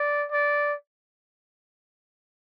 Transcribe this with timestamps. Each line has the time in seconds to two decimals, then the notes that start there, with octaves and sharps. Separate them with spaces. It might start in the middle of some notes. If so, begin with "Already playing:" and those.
Already playing: D5
0.31 D5